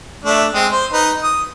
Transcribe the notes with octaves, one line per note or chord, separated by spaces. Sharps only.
A3 D4 E5
G#3 C4
C5
D#4 B4
D#6